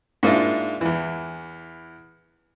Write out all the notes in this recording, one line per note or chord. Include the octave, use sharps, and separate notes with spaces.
G#2 A#3 D4 E4 F4
E2 E3